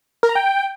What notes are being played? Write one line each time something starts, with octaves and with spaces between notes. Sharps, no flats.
A#4
A#5
G5